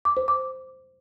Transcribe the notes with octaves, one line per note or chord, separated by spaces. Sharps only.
D6
C5
D6